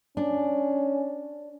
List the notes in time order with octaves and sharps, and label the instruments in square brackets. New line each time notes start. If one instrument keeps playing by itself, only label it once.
[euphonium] C#4 [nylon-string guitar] D4